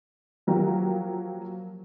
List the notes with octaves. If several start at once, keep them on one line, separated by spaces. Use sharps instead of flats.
F3 F#3 A#3 G4